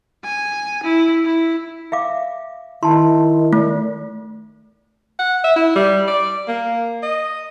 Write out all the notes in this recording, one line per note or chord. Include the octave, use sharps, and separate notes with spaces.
G#5
E4
E4
E5 F5 D6
D#3 E4 F4 A5 C6
A3
F#5
E5
E4
G3
D5
A#3
D#5